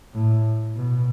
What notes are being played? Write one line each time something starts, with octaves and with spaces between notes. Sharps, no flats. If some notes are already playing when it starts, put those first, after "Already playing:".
A2
B2